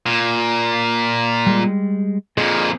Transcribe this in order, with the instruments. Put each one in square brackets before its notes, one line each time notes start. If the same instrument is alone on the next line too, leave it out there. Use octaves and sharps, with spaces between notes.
[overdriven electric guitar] A#2
[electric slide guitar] G3 G#3
[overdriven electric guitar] F2 A#2 [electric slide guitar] G#4 D#5